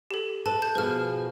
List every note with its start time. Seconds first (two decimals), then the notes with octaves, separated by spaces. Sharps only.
0.11 G4 A4
0.46 A4 B4 A5
0.62 A5 G6
0.75 B2 F3 G#4 B4 F6